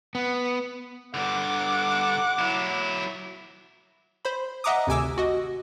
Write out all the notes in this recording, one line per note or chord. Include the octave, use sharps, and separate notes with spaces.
B3
G2 D3 F#5 D6
F#3 E4
C5 B5
D#5 E5 F#5 A#5 D6 D#6
G#1 D2 C3 G#5 D6 E6
F#4 D#5